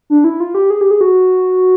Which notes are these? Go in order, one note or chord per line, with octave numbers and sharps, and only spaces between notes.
D4
E4
F4
G4
G#4
G4
G#4
F#4